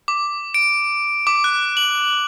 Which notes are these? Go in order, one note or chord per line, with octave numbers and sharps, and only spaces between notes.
D6
D7
D6
F#6
F#7